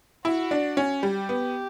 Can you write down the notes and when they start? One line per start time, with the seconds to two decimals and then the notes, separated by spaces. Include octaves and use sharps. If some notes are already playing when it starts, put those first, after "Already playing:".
0.25 E4 F#4
0.51 D4
0.77 C#4
1.03 G3 G4
1.29 B3